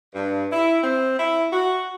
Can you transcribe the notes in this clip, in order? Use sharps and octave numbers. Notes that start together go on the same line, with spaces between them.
G2
E4
C4
E4
F#4